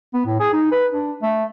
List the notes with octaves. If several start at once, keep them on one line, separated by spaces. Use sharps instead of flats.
B3
A2
G#4
D#4
B4
D4
A3